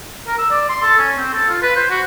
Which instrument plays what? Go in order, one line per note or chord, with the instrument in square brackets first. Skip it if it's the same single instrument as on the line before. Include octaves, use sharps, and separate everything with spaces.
[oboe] A#4
E6
D5
C6
A4
C#4
C4
A4
F4
B4
C5
F#4